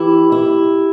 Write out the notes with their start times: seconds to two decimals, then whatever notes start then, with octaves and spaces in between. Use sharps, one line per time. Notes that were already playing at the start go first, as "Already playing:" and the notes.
Already playing: E3 E4 G4
0.32 E4